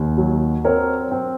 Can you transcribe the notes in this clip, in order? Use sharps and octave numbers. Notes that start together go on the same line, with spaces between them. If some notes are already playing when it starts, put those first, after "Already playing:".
Already playing: D#2
F#3
C4 A#4 C#5
C4